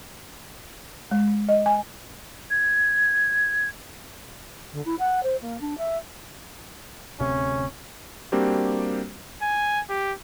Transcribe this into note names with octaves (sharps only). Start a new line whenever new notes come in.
G#3
D#5
G#5
G#6
D3
E4
F#5
C5
A#3
D4
E5
D1 D2 C3 C#4
G3 A#3 C4 D4 F#4 G4
G#5
G4